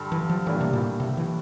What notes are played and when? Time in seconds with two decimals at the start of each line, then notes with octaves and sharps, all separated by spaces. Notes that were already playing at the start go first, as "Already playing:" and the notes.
Already playing: G2 D3 G3
0.12 E3
0.29 F3
0.46 A2 E3 G3 A#3 D4
0.61 C3
0.73 A#2
1.00 C3
1.17 E3